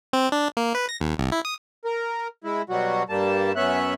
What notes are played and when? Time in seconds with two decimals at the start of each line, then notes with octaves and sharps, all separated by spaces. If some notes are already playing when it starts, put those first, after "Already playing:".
0.13 C4
0.32 D4
0.57 A#3
0.75 B4
0.89 A#6
1.01 D#2
1.18 C2
1.32 E4
1.45 D#6
1.85 A#4
2.44 G#3 E4
2.70 B2 F#3 G3 F#4
3.09 G2 G3 A#3 A5
3.56 F#2 B3 C#4 E5 F#6